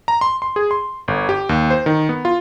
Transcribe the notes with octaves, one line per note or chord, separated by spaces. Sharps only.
A#5
C6
C6
G#4
C6
G1
G4
D#2
C5
D#3
B3
F4